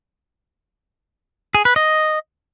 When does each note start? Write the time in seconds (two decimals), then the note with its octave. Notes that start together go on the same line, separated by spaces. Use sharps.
1.55 G#4
1.65 B4
1.76 D#5